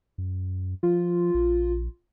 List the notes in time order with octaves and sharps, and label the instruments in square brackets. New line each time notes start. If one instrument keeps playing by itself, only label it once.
[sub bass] F#2
[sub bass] F3 [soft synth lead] F4
[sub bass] A#1